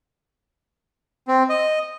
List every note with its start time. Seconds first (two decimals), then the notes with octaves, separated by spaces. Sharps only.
1.28 C4
1.49 D#5